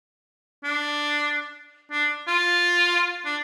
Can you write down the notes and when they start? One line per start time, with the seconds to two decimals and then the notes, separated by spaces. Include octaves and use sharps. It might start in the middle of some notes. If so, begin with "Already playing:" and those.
0.64 D4
1.91 D4
2.27 F4
3.25 D4